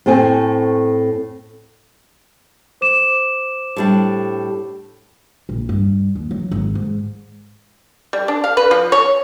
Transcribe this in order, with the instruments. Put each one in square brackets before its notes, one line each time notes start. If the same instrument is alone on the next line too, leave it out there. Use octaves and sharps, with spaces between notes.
[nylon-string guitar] A2 A3 C4 G#5
[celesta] C5 D6 E7
[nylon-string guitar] A2 G3 D4
[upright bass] A#1
G2
D#2
F#3
G#1
G#2
[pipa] G3
D4
F5
B4
F3
C#5